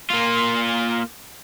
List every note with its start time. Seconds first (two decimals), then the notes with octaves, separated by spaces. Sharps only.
0.10 A#3 F4